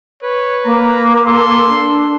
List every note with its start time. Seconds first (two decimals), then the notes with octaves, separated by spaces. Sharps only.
0.23 B4 C#5
0.65 A#3 A#5
1.26 A4 C6
1.69 D4